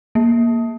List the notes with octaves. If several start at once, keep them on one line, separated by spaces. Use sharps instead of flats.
A#3